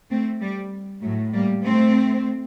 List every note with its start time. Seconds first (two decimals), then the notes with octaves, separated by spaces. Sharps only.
0.10 A3 C4
0.40 G3
1.02 A2 F#3 A3
1.33 G3 A#3
1.63 A3 C4